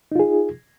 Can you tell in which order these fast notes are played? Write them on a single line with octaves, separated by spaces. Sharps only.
D#4 F4 G#4